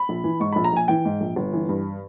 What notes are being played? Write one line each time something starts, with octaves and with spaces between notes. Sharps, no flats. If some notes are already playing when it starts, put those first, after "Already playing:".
Already playing: B5
A#1
E3
G#2 C#6
A#1 B5
A#5
A#1 G#5
E3 G5
G#2
A#1
G1
E3
G2